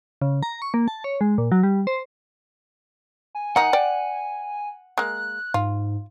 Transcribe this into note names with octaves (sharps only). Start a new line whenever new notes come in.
C#3
A#5
C#6
A#3
A5
C#5
G#3
A#2
F#3
G3
C5
G#5
D#3 D#4 F#5
D5 G5
G#3 A#3 F#6
G#2 F4